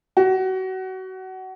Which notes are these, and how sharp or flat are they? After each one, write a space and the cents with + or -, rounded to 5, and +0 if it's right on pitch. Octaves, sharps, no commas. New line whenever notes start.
F#4 +25